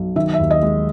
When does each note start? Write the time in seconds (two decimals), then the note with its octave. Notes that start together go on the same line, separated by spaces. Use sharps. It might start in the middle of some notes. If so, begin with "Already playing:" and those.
Already playing: B1
0.16 D#3 E5
0.34 E5
0.39 D#2
0.51 D#5
0.62 G#3